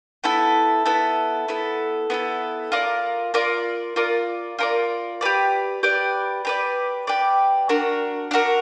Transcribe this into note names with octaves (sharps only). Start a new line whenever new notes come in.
B3 E4 A4
B3 E4 A4
B3 E4 A4
B3 E4 A4
F4 A#4 D5
F4 A#4 D5
F4 A#4 D5
F4 A#4 D5
G4 B4 D5
G4 B4 D5
G4 B4 D5
G4 B4 D5
D4 F#4 A#4
D4 F#4 A#4